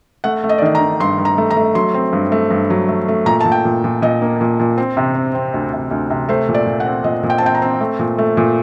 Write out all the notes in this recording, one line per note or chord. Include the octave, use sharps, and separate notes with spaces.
A3 F#5
A3
D#5
D5
D#3 D#5
A#5
D#3
G2 C6
G2
A#5
A3
A#5
A3
F#3 C6
C4
G2
A3
G2
F#3
A3
A3
A#2 A#5
A#2 A5
G5
A#2
A#2
A#2 D#5
A#3
A#2
A#2
C4
C3
C4
C4
D2
C3
D2
C3
A3 C5
A#2
D5
A#2
F#5
C4
A#2 D#5
A#2
G5
A5
C4 G5
A#5
C4
A3
A#2
A3
A#2